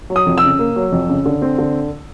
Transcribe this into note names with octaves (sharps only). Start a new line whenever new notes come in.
F#3
D#6
F2
E6
C#3
A#3
F#3
F2
C#3
D3
C4
D3